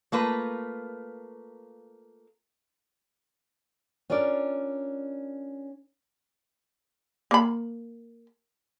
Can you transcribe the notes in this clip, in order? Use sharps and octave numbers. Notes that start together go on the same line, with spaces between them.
A3 A#3 F4 B4
C#4 D4 F4 A#4 D5
A#3 B5